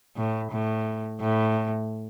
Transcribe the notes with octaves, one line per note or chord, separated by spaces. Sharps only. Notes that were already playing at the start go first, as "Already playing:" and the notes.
A2
A2
A2